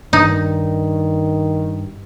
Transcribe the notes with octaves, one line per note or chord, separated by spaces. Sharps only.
G2 D#3 D#4